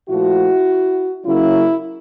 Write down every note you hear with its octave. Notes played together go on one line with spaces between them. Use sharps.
A#2 F3 A3 E4 F#4
C#3 F#3 A#3 C#4 E4